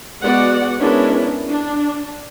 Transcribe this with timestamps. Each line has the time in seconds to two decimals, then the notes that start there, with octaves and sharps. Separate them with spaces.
0.22 G#3 B3 F#4 D5 F#5
0.78 G#3 B3 C#4 D4 E4 A#4
1.49 D4